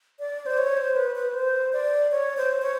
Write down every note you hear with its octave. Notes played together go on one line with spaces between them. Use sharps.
D5
C5
C#5
C5
B4
B4
C5
D5
C#5
C5
C#5